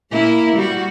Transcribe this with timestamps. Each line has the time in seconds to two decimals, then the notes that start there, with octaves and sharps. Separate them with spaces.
0.11 A#2 A#3 E4
0.56 G3 F#4